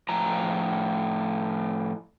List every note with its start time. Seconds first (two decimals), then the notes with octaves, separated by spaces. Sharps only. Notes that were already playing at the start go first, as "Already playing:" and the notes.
0.09 A2 F3 A#5